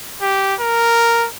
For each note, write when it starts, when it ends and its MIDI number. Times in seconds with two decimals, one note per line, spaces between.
0.22 0.55 67
0.60 1.28 70